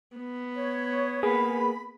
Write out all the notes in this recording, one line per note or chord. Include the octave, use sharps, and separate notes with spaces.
B3
C#5
A#3 G#4 B4 B5